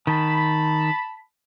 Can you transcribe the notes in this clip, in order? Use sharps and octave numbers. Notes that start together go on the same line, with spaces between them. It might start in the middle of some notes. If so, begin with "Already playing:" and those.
D#3 A5 B5